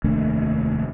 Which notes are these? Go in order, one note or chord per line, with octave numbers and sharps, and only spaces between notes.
F1 D#2 A3 D4